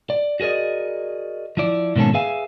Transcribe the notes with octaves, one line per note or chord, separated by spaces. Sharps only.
D5
F#4 G#4 A#4 D5 D#5
F3 E4 D5
G#2 B2 D#3 A#3 C#4 A4
G#4 B4 E5 F5 G#5